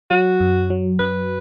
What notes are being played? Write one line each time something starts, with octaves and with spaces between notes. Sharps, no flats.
F#3 F#4
F#2
F#3
F#2 B4